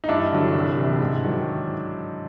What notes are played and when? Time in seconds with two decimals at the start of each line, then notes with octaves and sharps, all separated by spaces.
0.04 D#4
0.08 G2 D4 E4
0.32 D3 F#3
0.55 C2
0.77 C3 E3
0.99 G#2
1.23 D#3 F#3